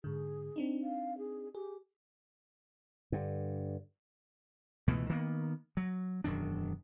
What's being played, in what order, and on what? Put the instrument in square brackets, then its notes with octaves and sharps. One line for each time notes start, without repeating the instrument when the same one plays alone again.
[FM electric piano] G#2 D3 [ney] G#4
[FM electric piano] C4 D4 D#4
[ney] F5
G#4
[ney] G4 [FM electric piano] G#4
[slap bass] G2 D3
C#2 B2 E3 A3
D#3 A#3 B3
F#3
E1 F#2 D#3 D4